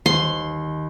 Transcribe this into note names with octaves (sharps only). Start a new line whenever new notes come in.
D#2 C6